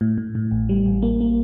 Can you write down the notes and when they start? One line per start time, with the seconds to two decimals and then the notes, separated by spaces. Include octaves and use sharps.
0.01 A2
0.18 A2
0.35 A2
0.51 A1
0.69 G3
0.86 A1
1.02 A#3
1.20 A#3